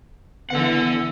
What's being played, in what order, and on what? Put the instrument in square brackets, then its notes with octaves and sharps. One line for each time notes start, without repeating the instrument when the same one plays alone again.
[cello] D3 E3 [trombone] B3 [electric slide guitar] A4 F#5